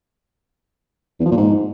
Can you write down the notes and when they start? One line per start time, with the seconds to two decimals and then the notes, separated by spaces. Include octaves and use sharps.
1.20 E2
1.26 F3
1.31 A#2
1.37 G#2